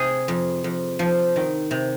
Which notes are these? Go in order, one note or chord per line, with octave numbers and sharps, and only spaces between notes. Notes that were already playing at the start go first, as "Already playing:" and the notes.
Already playing: C3 G#4
F2
F2
F3
D#3
C3